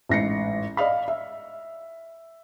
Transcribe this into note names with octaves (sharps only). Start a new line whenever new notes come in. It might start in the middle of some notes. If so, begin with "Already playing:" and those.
A1 G#2 A#6 C7 C#7
D5 D#5 F5 B5
E5